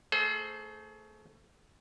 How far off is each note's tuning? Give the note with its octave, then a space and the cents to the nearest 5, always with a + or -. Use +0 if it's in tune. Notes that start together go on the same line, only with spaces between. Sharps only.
A3 +25 G#4 +40 C5 +0